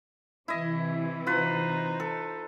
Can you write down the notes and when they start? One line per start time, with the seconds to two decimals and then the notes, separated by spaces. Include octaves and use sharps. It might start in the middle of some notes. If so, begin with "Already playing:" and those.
0.48 C3 E3 E4 D#5
1.26 D#4 F4 B4 C5
2.00 A4